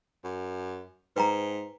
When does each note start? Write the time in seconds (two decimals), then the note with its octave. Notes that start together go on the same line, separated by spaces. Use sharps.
0.24 F#2
1.16 G#2 B4 G5 A#5